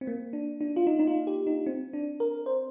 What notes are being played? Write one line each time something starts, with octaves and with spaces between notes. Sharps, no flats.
C4
A#3
D4
D4
F4
D#4
D#4
F4
G4
D#4
C4
D4
A#4
C5